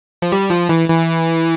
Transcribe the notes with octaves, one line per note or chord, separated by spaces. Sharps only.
F3
G3
F3
E3
E3